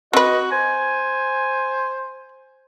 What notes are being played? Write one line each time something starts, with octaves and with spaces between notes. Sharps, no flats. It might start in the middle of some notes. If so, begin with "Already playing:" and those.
C4 F#4 B4 D#5
C5 G#5